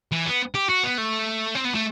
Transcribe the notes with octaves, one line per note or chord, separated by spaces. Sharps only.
E3
B3
G4
F#4
B3
A3
C4
B3
A3